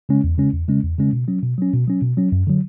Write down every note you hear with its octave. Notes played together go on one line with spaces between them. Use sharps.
C#3 G#3 C#4
E2
C#3 G#3 C#4
E2
C#3 G#3 C#4
E2
C#3 G#3 C#4
B2
F#3 C#4
B2
F#3 C#4
B2
F#3 C#4
B2
F#3 C#4
F#2
D3 F#3